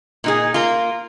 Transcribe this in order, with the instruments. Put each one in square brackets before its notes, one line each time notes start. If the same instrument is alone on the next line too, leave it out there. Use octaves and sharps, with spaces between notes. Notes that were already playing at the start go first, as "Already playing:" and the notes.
[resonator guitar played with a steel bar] A#2 D#4 G#4
A#3 F4